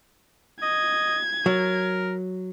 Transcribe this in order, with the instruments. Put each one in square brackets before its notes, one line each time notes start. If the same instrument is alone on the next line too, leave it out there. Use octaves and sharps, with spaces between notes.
[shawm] D#5 [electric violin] G#6
[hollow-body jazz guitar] F#3 [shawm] A#4